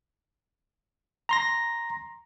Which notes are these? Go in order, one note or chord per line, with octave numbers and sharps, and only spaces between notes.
A#5 C6 A#6